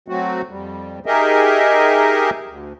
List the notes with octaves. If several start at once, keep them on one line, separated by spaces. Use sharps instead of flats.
F#3 A3 C4 F#4
F2 G3
D#4 G4 G#4 A#4 D#5 E5
D2